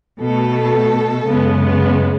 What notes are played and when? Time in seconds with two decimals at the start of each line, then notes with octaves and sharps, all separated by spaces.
0.21 B2 A3 A4
1.27 F#2 C#3 G#3 B3